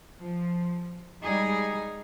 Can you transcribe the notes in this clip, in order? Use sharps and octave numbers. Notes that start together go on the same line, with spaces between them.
F3
G3 G#3 D#4 G#4